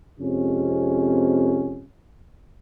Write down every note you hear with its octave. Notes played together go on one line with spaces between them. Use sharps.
F2 C3 G#3 C#4